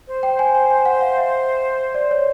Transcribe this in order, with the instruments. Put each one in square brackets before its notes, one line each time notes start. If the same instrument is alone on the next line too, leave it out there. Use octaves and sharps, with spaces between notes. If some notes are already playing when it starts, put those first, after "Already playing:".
[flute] C5
[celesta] G5
G#5
G#5
G#5
F#5
F5
E5
D5
C#5